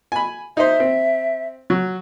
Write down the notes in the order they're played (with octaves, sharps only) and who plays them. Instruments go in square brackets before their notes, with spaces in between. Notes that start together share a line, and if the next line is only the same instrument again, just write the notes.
[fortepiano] G#5 B5
[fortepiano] D#4 C5 [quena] E5
[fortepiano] C4
F#3